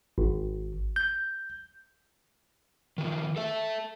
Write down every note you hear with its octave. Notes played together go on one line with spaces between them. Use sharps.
G#1
G6
D#3 F3
A4 E5